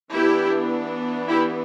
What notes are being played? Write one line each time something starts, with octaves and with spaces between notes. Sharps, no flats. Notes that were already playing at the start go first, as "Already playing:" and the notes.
E3 B3 D4 E4 G4
E4 G4